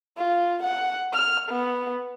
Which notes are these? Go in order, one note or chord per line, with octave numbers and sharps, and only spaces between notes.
F4
F#5
F6
B3